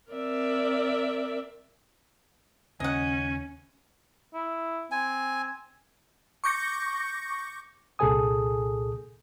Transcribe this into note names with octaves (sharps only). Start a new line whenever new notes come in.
C4 A#4 D5 E5
D#2 C#3 C#4 D#5 F#5 G#5
E4
C4 G#5
C#6 D6 G6 A#6 C#7
C2 A#2 G#4 A4 G#5 D#6